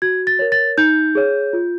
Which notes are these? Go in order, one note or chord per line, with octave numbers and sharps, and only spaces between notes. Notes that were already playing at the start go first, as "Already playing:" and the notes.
F#4 G#6
A6
A#4 C#5
A6
D#4 G6
G#4 C#5
F4